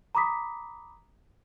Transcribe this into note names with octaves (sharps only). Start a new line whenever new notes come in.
A#5 B5 D6 D#6 B6